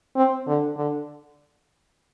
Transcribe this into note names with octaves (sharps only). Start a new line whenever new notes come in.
C4
D3
D3